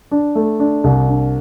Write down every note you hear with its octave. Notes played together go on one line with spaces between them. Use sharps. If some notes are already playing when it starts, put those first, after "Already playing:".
D4
A3
D4
C2
D4